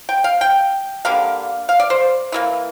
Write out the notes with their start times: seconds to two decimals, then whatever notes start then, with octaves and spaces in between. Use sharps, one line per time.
0.09 G5
0.24 F5
0.41 G5
1.05 D3 G3 A#3 F5
1.69 F5
1.79 D5
1.90 C5
2.32 E3 G3 A#3